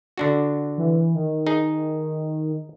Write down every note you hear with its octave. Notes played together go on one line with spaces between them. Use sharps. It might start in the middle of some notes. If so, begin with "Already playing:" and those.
D3 D4 F#4
E3
D#3
D#4 G#4